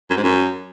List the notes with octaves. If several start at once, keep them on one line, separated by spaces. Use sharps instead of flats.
F#2
G#2
F#2